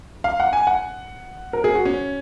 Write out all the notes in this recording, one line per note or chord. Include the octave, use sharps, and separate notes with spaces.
F5
F#5
G#5
F#5
A#4
G#4
F#4
C#4